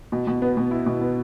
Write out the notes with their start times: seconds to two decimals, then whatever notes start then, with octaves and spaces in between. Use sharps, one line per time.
0.12 B2
0.27 B2
0.42 B3
0.57 B2
0.71 E4
0.86 B2
1.01 B3